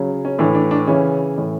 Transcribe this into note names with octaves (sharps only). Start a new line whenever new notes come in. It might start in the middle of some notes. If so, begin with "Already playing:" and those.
Already playing: C#3 F#3
C#4
A2 E3 D4
D4
D4
C#3 E3 C#4
A2 E3